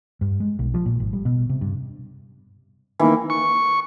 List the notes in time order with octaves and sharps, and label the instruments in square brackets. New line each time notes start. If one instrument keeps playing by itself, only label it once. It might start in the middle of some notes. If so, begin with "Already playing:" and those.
[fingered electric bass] G2
G#3
B1
F3
A#2
G#1
G3
B2
C3
G2
[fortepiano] D#3 A#3 [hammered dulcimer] E3
[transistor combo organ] C#6